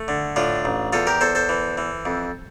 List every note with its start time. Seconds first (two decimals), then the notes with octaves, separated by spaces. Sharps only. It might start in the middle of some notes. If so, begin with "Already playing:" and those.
Already playing: A3
0.08 D3
0.36 A2 D4 F4
0.65 A1
0.93 E2 F4 A4
1.07 G4 A#4
1.21 E2 A4 C5
1.35 A4 C5
1.49 E3
1.78 E3
2.05 F2